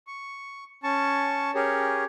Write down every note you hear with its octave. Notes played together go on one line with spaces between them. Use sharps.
C#6
C#4 A5 C#6
C#4 G4 G#4 A#4 C#5